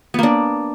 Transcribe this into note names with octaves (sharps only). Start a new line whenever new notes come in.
A#3 B3 D4